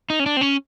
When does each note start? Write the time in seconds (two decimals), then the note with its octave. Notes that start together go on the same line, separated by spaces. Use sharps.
0.10 D#4
0.20 C#4
0.26 D4
0.37 C4
0.41 C#4